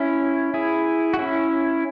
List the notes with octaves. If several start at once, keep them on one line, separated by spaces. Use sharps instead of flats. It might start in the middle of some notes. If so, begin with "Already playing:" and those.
Already playing: C#4 E4
E4 G#4
F#4
C#4 E4